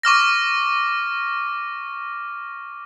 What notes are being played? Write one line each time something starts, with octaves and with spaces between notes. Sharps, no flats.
C#6 D6 F6 A#6